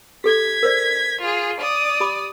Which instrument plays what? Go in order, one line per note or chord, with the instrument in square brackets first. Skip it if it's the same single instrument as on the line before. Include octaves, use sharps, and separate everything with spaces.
[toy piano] G4 A4 [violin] G#6 B6
[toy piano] A#4 C5 D5
[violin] F4 G#4
D5 D#6
[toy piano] G4 B5 D6